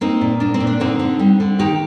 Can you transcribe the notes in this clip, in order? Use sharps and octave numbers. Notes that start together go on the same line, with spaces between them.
A#3 C4 D#4
A#2
A#3 D4
C4
A#2
D4
D3 C4 D#4
D3
G3
D3
D#3 D#4 G4